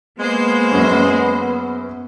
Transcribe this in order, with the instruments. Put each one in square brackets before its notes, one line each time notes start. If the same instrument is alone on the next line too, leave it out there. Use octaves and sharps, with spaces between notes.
[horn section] G#3 [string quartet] A#3 C5 [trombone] B3
[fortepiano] F#2 C#4